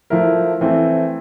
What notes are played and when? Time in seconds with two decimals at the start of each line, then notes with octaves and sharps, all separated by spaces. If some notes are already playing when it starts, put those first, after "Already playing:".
0.10 F3 A3 E4 A#4
0.61 E3 A3 C4